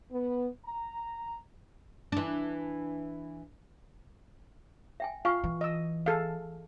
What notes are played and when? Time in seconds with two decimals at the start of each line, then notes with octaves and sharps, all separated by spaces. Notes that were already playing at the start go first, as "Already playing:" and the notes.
0.11 B3
0.65 A#5
2.12 E3 D4
5.00 E5 G5 G#5
5.25 F4 F5 G#5 C#6
5.44 E3
5.61 D#5 E6
6.06 G#4 A4 F5